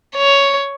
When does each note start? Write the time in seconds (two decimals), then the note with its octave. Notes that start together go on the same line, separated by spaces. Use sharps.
0.16 C#5